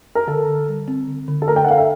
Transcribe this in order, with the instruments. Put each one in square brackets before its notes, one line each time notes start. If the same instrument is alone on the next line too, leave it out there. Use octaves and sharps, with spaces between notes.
[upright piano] A#4
[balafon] D3 [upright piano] A4
[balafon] D3
G3
C4
D3
D3
[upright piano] A4
[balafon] A3 [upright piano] A#4
[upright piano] G5
F#5
[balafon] A4 [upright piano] F5
[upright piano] E5